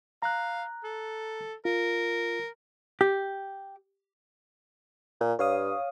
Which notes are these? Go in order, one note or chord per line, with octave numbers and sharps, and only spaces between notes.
F5 A#5 F#6
A4
F4 A#4
G4
A#2
G2 C#5 F5 D#6